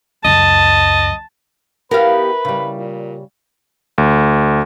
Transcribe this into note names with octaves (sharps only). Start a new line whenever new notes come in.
C#2 F#2 D#5 A5
B3 E4 G4 A#4 B4 F5
C#3 G3
A#2
D2